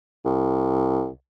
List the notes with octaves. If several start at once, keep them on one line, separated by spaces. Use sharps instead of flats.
C2